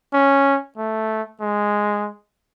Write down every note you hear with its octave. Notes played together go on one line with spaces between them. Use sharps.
C#4
A3
G#3